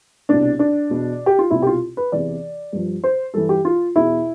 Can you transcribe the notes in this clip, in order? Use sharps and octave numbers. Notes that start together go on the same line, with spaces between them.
C2 B2 D4
D4
E2 B2
G4
F4
C2 B2 E4
G4
F4
B4
E2 C3 E3 D5
G2 F3
C5
G2 E3 A4
G4
F4
E2 B2 E4